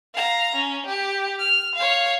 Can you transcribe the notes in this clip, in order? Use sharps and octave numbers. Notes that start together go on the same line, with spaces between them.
F5 A#5
C#4
G4
F6
C#5 F5